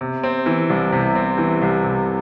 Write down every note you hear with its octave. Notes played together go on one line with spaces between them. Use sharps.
C3
C4
E3
C2
C3
C4
E3
C2
C3